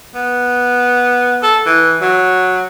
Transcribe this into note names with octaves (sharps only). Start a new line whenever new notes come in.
B3
A4
E3
F#3